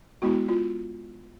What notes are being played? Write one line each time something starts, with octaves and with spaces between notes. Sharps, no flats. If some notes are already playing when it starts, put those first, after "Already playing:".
G#3 B3 E4 F#4
F4